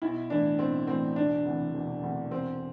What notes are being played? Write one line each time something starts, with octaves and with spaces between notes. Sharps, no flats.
B1 E4
A2 E3 D4
B1 C4
A2 E3 C4
E1 D4
D2 C3 E3
E1
D2 C3 E3
E1 C4